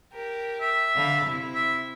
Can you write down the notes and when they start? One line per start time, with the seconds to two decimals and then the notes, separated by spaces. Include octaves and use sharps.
0.12 G4 A#4
0.61 E5
0.95 D3 F5 B5
1.25 C3 E4
1.55 E5